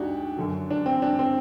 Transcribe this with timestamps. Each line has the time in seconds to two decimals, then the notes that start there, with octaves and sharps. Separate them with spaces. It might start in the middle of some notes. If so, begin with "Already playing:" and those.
Already playing: D2 D4 D#4 F#4 G4
0.37 F#2 D3 F#3
0.71 D4
0.86 C4
1.02 D4
1.19 C4